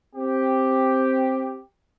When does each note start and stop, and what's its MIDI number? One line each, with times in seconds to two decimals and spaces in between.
0.14 1.61 60
0.14 1.61 67